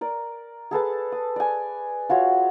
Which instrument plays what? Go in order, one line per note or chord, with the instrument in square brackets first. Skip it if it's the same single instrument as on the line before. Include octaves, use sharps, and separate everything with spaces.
[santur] A#4 D5
G#4 A4 B4 A5
D#6
D5 G#5
F4 F#4 C#5 E5